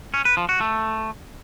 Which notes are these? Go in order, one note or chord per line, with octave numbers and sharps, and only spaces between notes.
C#4
B4
F3
F#4
A3